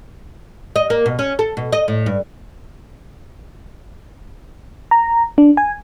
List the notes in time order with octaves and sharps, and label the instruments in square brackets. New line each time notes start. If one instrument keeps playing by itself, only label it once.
[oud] D#5
A#3
B2
C#4
A4
B2
D#5
A2
G2
[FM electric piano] A#5
D4
G#5